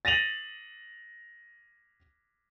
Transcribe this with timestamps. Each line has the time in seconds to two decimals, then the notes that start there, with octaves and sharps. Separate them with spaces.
0.05 A6 A#6 D#7 F7 F#7